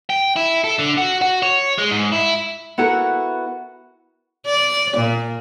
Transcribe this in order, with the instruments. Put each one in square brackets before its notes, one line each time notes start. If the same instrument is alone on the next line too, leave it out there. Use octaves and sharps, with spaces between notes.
[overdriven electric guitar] G5
E4
A4
D3
F#4
F#4
C#5
G#3
G#2
E4
[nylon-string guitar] B3 E4 F#4 A4 A#4
[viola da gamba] D5
A#2